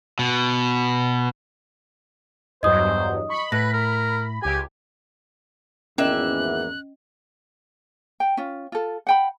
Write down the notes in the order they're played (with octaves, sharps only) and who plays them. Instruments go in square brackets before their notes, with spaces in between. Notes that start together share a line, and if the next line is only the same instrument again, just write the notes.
[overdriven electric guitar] B2
[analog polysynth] E2 G2 F#3 [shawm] C5 [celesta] D#5 D#6
[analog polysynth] B5 [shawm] C#6
[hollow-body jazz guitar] A2 [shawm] B4 [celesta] A#6
[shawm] A#4
[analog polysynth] C#2 G4 [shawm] G#5
[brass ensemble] G#1 E2 [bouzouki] A#3 E5 [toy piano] C#4 D#5 [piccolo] F#6
[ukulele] G5
C#4 F4
F4 A4
F#5 G5 B5